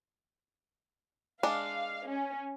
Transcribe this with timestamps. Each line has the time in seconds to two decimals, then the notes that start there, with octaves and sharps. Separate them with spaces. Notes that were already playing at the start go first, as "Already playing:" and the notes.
1.43 G#3 D4 D5 F5
2.08 C#4